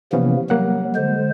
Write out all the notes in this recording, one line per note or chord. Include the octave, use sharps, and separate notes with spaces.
C3 E3 F3 A#3 B3 C#4
F#3 G3 A#3 F#5
D3 G#3 C5